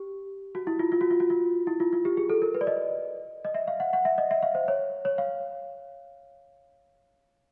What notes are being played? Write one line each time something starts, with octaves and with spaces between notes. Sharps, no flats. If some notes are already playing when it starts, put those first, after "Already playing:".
Already playing: G4
F#4
E4
F4
F4
F#4
F4
F#4
F4
E4
F4
F4
G4
G#4
A4
A#4
B4
D5
D#5
D#5
E5
F5
F#5
F#5
E5
D#5
E5
F5
C5
C#5
C#5
F5